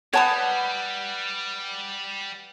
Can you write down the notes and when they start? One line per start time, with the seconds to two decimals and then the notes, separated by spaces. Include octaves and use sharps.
0.13 G3 B4 C#5 F#5 A5 D#6